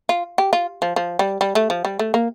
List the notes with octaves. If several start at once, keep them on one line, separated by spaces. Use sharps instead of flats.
F4
G4
F4
F3
F3
G3
G3
A3
F3
G3
A3
A#3